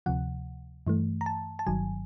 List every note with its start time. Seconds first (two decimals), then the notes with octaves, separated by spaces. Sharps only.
0.06 D2 C3 F3 F#5
0.87 G2 E3 A3
1.21 A#5
1.26 A5
1.59 A5
1.67 G1 G2 D#3 F#3 G#5